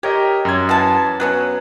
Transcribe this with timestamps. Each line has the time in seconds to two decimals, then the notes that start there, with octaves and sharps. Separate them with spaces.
0.03 G4 A#4 C#5 D#5
0.45 F#2 G#6
0.69 E3 F#5 A5
1.20 F#3 B3 C#4 F#6